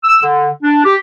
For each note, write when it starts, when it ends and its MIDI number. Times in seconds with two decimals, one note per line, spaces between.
0.04 0.22 88
0.22 0.48 50
0.63 0.84 62
0.84 0.95 67